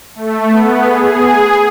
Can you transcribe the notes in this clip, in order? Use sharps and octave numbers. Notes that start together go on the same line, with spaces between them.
A3
B3
G#4